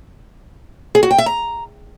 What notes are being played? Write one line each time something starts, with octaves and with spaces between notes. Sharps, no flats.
G#4
F#4
G5
E5
A#5